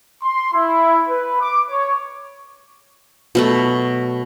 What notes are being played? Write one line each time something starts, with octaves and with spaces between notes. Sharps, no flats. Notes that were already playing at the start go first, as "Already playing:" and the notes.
C6
E4
B4
D6
C#5
B2 F#3 A3